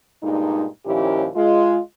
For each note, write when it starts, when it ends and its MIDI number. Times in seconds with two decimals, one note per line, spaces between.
0.22 0.66 43
0.22 0.66 46
0.22 0.66 56
0.22 0.66 63
0.85 1.27 39
0.85 1.27 46
0.85 1.27 53
0.85 1.27 61
0.85 1.27 64
0.85 1.27 67
1.36 1.78 56
1.36 1.78 65